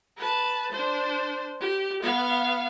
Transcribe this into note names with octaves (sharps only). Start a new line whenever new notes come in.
B4 A5
D4 C5
G4
B3 F5